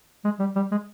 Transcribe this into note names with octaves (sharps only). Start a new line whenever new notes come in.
G#3
G3
G3
G#3